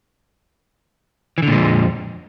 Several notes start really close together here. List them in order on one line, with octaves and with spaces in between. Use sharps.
E3 D3 A#2 G#3 F2